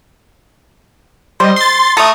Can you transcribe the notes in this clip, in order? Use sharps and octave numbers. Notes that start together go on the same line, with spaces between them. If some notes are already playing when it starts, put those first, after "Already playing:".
G3 C5 D#5
C6 A6
A3 A4 A#5 D#6